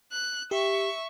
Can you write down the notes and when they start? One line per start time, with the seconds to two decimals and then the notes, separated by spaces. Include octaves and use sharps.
0.12 F#6
0.51 G4 E5 C#6